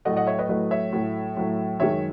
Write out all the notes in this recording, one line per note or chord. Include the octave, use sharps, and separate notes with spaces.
A2 F#3 A3 D#5 F#5
D#5 F#5
C#5 E5
B4 D#5
A2 F#3 A3 B4 D#5
C#5 E5
A2 F#3 A3
A2 F#3 A3
F#2 D#3 G#3 C#5 E5